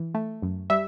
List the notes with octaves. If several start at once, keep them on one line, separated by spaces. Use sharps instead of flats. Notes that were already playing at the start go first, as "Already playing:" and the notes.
Already playing: E3
A3
F#2
G3 E5